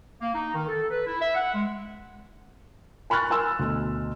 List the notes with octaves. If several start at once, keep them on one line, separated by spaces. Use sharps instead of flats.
A#3
D#4
D#3
A4
B4
E4
E5
F#5
G#3
G#5 B5 C#6 F6 F#6 A6
A#4 G#5 C6 E6
D2 B2